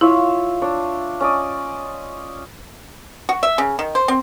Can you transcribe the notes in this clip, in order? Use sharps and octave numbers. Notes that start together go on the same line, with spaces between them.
E4 F4 C#5 E5
D4 C#5
C#4 D5 D#5
F#4
E5
C#3
D#3
C5
C4